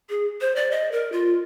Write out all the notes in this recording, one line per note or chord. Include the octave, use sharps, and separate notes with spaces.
G#4
C5
D5
D#5
A#4
F4